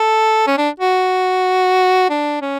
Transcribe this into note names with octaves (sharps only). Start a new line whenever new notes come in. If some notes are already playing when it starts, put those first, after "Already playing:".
Already playing: A4
C#4
D4
F#4
D4
C#4